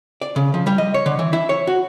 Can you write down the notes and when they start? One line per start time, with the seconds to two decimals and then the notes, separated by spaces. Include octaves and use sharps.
0.21 D5
0.36 C#3
0.54 F3
0.67 G3
0.78 D#5
0.94 C#5
1.06 D3
1.19 E3
1.33 E4
1.49 C#5
1.67 F#4